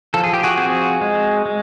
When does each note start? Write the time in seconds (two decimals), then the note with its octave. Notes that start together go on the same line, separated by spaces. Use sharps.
0.14 F3 A4
0.24 G#4
0.33 G4
0.44 F#4 G#4
0.58 C4 F#4 G#4
1.01 G#3
1.46 G#3